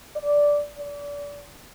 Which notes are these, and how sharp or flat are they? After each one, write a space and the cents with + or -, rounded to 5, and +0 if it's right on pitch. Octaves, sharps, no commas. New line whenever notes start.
D5 -10
D5 -30